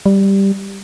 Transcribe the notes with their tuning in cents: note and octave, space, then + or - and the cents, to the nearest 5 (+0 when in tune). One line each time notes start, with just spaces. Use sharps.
G3 +0